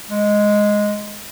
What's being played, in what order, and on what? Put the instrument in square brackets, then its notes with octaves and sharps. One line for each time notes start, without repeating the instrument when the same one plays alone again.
[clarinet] G#3